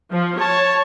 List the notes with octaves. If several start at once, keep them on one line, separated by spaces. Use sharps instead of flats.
F3
C#5 A5